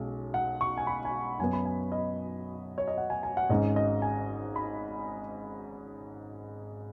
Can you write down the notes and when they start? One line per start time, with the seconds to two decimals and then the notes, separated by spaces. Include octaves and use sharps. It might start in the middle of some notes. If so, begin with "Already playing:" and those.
Already playing: B1 G#3 C#4
0.34 F#5
0.61 C#6
0.77 G#5
0.87 B5
1.05 G#5
1.39 F#2 F#3 B3 G#5
1.53 B5
1.65 G#5
1.92 D#5
2.78 C#5
2.88 D#5
2.98 F#5
3.10 G#5
3.23 G#5
3.37 F#5
3.49 G#1 G#2 G#3 C#4 D#5
3.76 D#5
4.02 G#5
4.56 B5